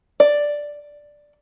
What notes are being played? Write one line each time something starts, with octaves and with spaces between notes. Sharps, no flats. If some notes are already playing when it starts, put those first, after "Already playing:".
D5